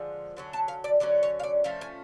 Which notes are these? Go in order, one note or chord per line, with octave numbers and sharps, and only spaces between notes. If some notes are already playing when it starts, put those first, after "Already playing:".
Already playing: D3 F3 G#3
D3 F#3 C#4
A5
F5
D5
D3 F#3 C#4 D5
C#5
F5
D5
F3 A3 C#4 F5
G#5